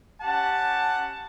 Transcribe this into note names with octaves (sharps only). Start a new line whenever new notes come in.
C#4 G4 F#5 A5